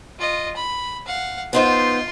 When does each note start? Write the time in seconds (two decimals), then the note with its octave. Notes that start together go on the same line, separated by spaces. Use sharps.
0.19 F4 D#5
0.56 B5
1.07 F5 F#5
1.53 B3 D#4 F4 C5 C6